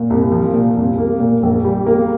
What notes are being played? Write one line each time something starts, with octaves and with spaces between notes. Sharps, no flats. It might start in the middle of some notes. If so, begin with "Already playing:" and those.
Already playing: A#2
C2
F3
A#2
C2
A#3
A#2
A#1
G3
A#3